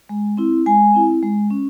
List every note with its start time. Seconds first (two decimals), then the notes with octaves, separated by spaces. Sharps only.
0.09 G#3
0.37 C4 E4
0.66 G#3 G#5
0.94 C4 E4
1.23 G#3
1.50 C#4